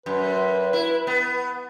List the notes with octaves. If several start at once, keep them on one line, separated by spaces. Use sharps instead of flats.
F#2 B4
E4
B3